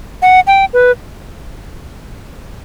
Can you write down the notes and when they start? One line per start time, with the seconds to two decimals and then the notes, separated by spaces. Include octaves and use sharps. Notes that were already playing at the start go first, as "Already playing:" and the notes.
0.22 F#5
0.47 G5
0.73 B4